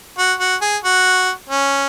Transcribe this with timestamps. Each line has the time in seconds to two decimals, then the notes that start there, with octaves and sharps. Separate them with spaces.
0.18 F#4
0.40 F#4
0.62 G#4
0.84 F#4
1.49 C#4